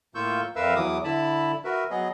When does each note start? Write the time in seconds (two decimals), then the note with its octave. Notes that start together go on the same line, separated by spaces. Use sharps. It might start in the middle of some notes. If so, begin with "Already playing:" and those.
0.15 A2 A#3 F4 C#6 E6 G6
0.56 F2 A#4 B4 E5 F5 E6
0.76 E2 E3 F#3 D6 D#6
1.04 D3 E4 A5 B5
1.64 F#4 A#4 B4 E5
1.90 F#3 B3 G#4 D#5